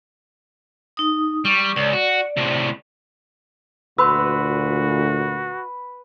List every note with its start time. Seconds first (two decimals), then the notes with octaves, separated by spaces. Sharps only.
0.97 D#4 D#6
1.45 G3 C#6
1.76 C#2 D5
1.93 F#4
2.37 A2 C3
3.98 D2 A#2 F#4 B4 C6 E6